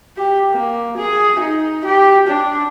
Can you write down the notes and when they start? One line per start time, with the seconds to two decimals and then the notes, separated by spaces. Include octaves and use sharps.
0.17 G4
0.51 A#3
0.97 G#4
1.39 D#4
1.85 G4
2.27 D4